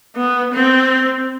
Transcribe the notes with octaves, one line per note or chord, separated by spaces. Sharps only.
B3
C4